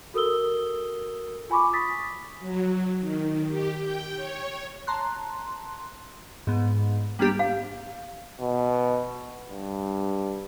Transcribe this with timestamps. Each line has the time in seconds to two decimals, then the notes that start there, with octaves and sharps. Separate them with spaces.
0.14 F#4 A4 A#4 D#6 E6 G7
1.50 F4 G#5 B5 C#6 D6
1.73 D#6 A6 B6
2.39 F#3
2.99 D#3
3.48 G4
3.81 G5
4.16 C#5
4.87 A5 A#5 C6 F#6
6.47 G#2 B3
7.19 G3 A#3 B3 D4 G4
7.39 F5
8.40 B2
9.50 G2